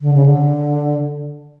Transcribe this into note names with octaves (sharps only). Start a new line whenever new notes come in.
D3
C#3
D3